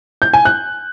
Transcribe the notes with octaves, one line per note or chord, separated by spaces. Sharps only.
G6
G#5
F#6